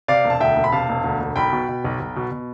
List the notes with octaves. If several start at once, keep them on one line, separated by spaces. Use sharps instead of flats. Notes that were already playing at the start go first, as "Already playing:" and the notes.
C3 D5 F5
E1
A5
D2 E5 G5
E1
B5
C3 F5 A5
E1
D2
E1
B1 G5 B5
B2
B2
B1
B1
B2
B2